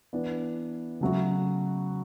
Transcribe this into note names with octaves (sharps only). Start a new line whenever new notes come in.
E3 B3 D4
C#3 F#3 A3 C#4 F#4